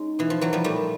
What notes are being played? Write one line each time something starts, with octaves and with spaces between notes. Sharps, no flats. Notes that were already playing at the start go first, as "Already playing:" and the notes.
Already playing: G#3 C#4 D#4
B2 E3
F3
E3 F#3
F3 G3
A#2 G3 A3